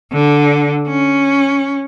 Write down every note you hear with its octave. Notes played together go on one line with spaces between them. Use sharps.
D3
C#4